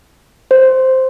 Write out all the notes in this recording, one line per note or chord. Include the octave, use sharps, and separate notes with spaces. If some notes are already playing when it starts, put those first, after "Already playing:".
C5